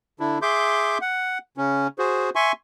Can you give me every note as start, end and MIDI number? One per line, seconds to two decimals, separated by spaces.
0.20 0.38 50
0.20 0.38 62
0.20 0.38 64
0.42 0.98 68
0.42 0.98 76
0.42 0.98 84
0.42 0.98 86
0.42 0.98 91
1.01 1.38 78
1.57 1.87 49
1.57 1.87 61
1.99 2.30 66
1.99 2.30 68
1.99 2.30 72
2.35 2.52 76
2.35 2.52 80
2.35 2.52 84
2.35 2.52 85